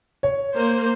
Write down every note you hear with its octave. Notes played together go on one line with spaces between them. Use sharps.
C#5
A#3 C5